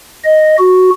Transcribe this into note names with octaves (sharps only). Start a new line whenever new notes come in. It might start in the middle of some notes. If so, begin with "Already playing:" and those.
D#5
F#4